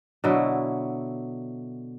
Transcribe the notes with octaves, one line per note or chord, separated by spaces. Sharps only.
B2 D3 F#3 E4